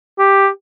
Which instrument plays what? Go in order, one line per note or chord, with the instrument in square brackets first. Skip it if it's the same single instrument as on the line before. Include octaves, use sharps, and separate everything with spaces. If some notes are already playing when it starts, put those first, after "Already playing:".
[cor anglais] G4